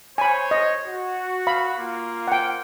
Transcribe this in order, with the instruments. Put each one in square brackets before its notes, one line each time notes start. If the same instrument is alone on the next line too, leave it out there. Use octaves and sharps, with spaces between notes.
[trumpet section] C5 C#5 [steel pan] G#5 B5
[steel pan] D#5
[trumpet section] F#4
[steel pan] F5 B5
[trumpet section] A#3 F4
[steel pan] F#5 G5